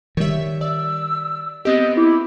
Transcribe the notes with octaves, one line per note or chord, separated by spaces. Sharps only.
D#3 G3 C#5 E5
D5 E6
B3 C4 G4 D#5
E4 D6